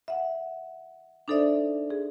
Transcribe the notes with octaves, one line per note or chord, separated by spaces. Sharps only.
E5 F#5
D4 D#4 A4 C5 D5 E5
G#4